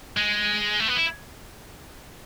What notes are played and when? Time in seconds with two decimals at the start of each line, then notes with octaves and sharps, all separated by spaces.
0.17 G#3
0.80 A3
0.88 B3
0.97 E4